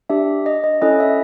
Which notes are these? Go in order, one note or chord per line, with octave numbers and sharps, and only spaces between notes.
D4 G4 E5
D#5
D#5
C#4 E4 A4 D#5
E5